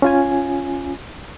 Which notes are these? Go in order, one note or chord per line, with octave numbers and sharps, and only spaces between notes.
C#4 F4 G#5